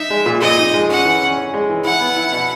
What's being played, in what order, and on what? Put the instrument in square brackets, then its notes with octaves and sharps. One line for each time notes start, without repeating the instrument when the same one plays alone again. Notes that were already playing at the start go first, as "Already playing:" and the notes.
Already playing: [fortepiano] D#4 [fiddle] E5
[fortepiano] G#3
A#2
[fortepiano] A#2 [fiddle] D#5
[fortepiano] D#4
G#3
[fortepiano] C#4 [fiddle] F#5
[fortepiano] E3
C#4
C#4
G#3
E3
[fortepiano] E4 [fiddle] F#5
[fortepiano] B3
E4
B2